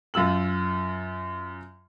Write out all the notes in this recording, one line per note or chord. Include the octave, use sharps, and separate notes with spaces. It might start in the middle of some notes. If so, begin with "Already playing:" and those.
F#2 F4 E6 F#7